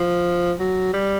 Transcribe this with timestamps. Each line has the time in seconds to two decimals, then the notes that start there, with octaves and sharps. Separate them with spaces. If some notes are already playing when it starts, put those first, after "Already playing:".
Already playing: F3
0.59 F#3
0.94 G3